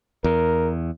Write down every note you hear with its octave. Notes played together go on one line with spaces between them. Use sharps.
E2 A#4